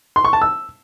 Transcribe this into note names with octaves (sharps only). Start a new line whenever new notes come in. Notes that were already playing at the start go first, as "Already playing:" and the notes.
C6
C#6
A5
E6